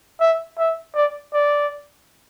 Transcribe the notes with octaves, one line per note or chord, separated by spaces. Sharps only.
E5
E5
D5
D5